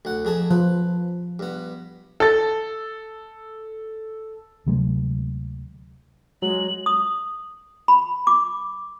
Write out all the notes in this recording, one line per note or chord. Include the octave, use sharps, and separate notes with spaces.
D2 F#5
F2 G#4 A5
F3 B4
G2 B3
A4 A6
D2 C3 F#3 G#3
F#3 G#3 F#7
D#6
B5
D6